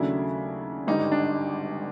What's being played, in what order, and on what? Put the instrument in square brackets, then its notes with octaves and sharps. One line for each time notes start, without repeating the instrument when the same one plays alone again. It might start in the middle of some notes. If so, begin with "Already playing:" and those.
Already playing: [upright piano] D#2 C#3 F#3 A3 D4 [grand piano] E4
[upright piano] G#1 G2 D3 G3 [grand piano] D#4
[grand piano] D4